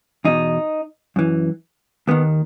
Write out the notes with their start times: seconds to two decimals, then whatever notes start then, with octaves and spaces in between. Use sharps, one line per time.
0.25 E2 B2 D#4
1.16 F#2 E3
2.08 D#2 D#3 B3